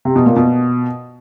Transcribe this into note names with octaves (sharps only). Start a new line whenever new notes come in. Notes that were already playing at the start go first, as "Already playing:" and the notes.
C3
B2
A#2
B2